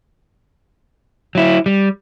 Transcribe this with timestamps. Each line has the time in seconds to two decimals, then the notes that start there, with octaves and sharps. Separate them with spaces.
1.35 F#3 E4
1.66 G3